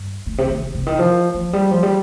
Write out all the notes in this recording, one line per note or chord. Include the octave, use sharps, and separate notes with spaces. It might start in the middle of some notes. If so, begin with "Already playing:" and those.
Already playing: G2
A2
C3
D#3
D#3
C3
D#3
F3
F3
G3
F3
G3